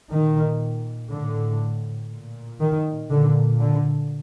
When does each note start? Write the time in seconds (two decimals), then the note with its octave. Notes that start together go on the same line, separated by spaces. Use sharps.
0.11 A#2 D#3
1.11 A2 D3
2.11 A#2
2.60 D#3
3.10 A#2 D3
3.61 D3